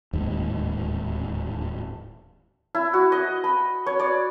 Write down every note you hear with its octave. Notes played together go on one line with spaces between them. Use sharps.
D1 D#2 G#2
E4
F#4
D#5
B5
C#5
D5